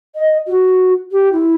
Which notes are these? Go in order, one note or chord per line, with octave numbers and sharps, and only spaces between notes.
D#5
F#4
G4
E4